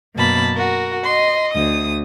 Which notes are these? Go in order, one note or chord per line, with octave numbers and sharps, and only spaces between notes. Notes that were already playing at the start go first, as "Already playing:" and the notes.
F#2 B2 A#3 A5 B5
F#4 A#4
D#5 C6
D2 D#6